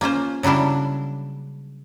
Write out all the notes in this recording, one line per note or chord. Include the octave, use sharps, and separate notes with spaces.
A#3 C#4 F4 C5
C#3 F#3 G3 D4 E4